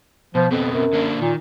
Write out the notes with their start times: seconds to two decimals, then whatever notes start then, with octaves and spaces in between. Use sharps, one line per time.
0.35 B2 F3
0.51 F2 B2 B3 C4
0.73 F#2
0.93 D3 A#3 D4
1.21 A#2 D#3